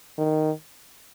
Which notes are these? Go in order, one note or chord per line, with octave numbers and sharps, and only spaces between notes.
D#3